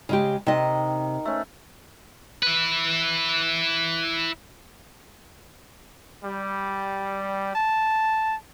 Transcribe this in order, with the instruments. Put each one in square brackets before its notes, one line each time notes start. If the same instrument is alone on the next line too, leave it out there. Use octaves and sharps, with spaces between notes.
[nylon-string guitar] C#3 G#3 G4
[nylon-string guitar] C3 D#5 [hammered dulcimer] D#3
[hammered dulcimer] A3 C#4
[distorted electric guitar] E4 B4
[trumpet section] G3
A5